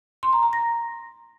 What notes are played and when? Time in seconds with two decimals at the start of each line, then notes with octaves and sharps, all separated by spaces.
0.23 C6
0.33 A#5
0.43 A#5
0.53 A#6